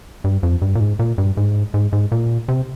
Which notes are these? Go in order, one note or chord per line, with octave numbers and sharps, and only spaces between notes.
G2
F2
G2
A#2
G#2
A#2
G2
G#2
G#2
G#2
A#2
C3